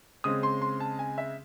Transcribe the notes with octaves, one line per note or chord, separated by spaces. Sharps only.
C#3 G#3 C4 D#6
C6
C6
A5
G#5
E5